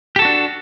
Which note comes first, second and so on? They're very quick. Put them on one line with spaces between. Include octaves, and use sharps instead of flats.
G4 A4 F#4 D4